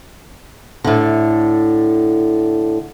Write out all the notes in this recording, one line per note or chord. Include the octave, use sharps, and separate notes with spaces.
A2 D3